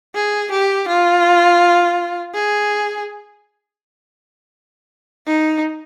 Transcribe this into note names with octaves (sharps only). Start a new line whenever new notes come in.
G#4
G4
F4
G#4
D#4